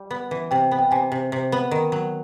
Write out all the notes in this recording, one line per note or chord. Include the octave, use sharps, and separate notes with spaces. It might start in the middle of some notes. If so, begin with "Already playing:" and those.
Already playing: G3
B3
E3
C3 G5
B3
G5
C3 G#5
C3
C3
B3
D#3
F#3